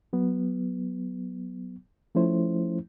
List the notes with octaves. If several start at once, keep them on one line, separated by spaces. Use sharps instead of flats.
F#3 B3
F3 A3 C#4 E4 C5